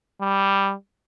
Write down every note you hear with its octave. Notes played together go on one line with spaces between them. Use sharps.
G3